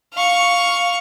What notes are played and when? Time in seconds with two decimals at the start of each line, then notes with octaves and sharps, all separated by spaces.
0.13 F5 C#6